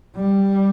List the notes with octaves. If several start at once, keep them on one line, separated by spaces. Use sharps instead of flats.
G3